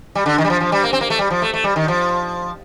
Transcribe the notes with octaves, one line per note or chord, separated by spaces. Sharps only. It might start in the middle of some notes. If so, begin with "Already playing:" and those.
G3
D3
D#3
G3
F3
F3
G3
A#3
C4
A#3
A3
G3
F3
A3
A3
G3
D#3
F3